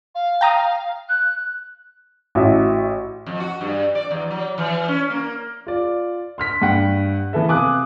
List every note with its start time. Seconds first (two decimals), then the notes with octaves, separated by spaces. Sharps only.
0.14 F5
0.41 G5 A#5 D#6
1.09 F#6
2.35 A1 F#4 E5
3.26 F2
3.40 F#4
3.61 G2
3.95 D5
4.11 E2
4.31 F#3
4.58 E3
4.88 C#4
5.10 A#3
5.67 F4 D5
6.38 C6 F6 B6
6.62 G2 F#5 G5
7.33 E3 B3 A4 E5
7.48 C3 F5 G#5 D6 D#6 F#6